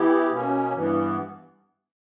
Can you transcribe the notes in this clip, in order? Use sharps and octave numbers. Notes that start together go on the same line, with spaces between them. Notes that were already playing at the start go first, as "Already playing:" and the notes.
Already playing: E3 B3 E4 G4
B2 A#3 C#4
G2 E3 B3